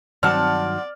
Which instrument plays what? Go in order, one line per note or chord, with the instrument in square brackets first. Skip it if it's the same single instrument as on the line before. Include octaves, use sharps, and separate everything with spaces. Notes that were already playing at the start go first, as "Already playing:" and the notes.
[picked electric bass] G2 D#3 F#3 [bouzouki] C4 F#5 A5 [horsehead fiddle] D5 [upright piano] F6